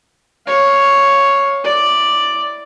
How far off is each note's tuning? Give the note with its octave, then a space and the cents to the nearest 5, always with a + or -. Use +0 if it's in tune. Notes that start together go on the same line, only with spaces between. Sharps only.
C#5 +0 F5 +15
E4 +0 D5 +5